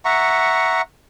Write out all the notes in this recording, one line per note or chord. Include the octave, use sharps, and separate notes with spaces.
E5 F#5 A#5 C#6